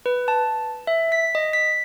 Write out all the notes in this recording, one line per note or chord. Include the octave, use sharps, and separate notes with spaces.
B4
A5
E5
B6
D#5
B6